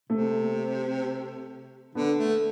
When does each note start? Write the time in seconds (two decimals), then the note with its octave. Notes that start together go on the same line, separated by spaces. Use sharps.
0.10 C3 A3
1.95 D3 B3
2.19 A3